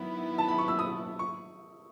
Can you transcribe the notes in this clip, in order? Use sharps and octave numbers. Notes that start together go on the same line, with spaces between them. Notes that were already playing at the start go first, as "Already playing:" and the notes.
Already playing: G#2 D#3 F#3 B3 E4
A5
B5
C#6
E6
D#6
C#6